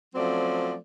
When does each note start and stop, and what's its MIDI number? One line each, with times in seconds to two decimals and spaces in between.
0.15 0.74 53
0.15 0.74 54
0.15 0.74 57
0.15 0.74 60
0.15 0.74 61
0.15 0.74 74